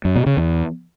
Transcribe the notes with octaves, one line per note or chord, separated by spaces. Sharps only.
F#2
B2
C#3
E2